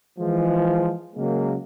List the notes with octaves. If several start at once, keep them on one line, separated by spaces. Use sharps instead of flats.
E3 F3 G#3
C#3 F#3 G#3 A#3